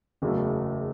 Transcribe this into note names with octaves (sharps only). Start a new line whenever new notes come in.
F#1 E2 C#3 F#3 A3